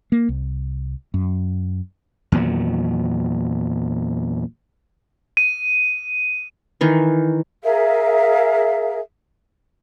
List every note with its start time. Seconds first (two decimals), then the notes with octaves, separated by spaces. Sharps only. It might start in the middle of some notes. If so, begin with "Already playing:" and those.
0.12 A#3
0.29 C2
1.14 F#2
2.32 E2 A#2 D#3 F#3
5.37 D#7
6.81 D#3 E3
7.63 G#4 A#4 E5 F5